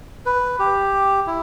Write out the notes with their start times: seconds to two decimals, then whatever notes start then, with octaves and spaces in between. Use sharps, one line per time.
0.26 B4
0.59 G4
1.27 E4